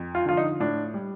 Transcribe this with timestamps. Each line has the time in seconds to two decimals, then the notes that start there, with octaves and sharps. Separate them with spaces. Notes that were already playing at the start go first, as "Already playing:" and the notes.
Already playing: F2
0.15 F4
0.26 D3 F3 F4
0.37 D#4
0.60 A2 D4
0.94 G3